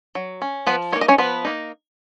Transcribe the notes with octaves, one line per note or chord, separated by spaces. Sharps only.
F#3
C#4
F3 B3 B4
A#3 D#4 C#5
D#5
C#4 C#5
F3 B3 B4
A#3 D#4